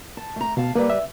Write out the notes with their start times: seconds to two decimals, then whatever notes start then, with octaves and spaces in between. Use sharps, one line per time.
0.17 A5
0.36 A3 A#5
0.57 B2 F5 A5
0.76 G3 A#3 G4 B4
0.90 E5